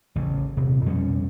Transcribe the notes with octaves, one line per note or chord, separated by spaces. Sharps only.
A1 C#3
D#1 C3
F2 B2 G3 C#4